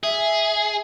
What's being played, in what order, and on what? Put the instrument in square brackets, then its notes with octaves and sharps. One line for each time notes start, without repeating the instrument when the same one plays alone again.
[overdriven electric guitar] G#4 [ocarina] E5